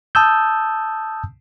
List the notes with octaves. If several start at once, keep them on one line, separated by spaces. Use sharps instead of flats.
A5 D#6 E6 G6